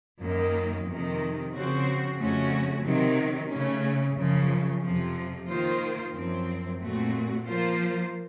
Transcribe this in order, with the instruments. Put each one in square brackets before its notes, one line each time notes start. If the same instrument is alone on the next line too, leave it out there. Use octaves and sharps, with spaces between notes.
[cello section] F#2 D#3 A#3
F2 C3 D#3
C#3 F3 C4 F#4 C5
F2 C#3 A3 C#4 F#4
C3 D#3 F#3
C#3 A3 C#4
F#2 C#3 F3
F2 C3 F3
D#3 A#3 F4 C5
F#2 F3 C4
A#2 A3 C4 F#4
F3 A#3 F4 C5